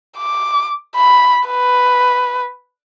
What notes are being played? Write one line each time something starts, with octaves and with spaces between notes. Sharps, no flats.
D6
B5
B4